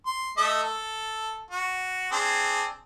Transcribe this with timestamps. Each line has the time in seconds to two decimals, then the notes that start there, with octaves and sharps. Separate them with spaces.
0.06 C6
0.37 A3 D#5 E5
0.63 A4
1.51 F#4
2.12 C4 D4 G#4